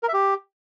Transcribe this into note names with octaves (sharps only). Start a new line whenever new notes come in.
A#4
E5
G4